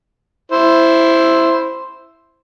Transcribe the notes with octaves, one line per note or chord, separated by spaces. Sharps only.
E4 C5